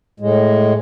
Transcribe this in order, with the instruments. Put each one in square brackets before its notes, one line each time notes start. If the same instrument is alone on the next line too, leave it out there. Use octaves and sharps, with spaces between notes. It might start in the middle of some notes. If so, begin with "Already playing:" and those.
[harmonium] A2 G#3